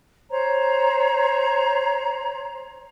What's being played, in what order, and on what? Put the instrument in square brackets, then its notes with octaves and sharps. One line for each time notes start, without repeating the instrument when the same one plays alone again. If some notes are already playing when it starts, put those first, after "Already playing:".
[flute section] C5 C#5 A#5